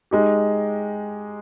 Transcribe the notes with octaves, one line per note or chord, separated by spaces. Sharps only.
G#3 D#4 G4